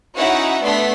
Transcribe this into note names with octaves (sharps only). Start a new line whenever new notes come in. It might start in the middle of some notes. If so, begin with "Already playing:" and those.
C#4 D#4 E4 F#4 E5 F#5
A3 B3 D4 C6 B6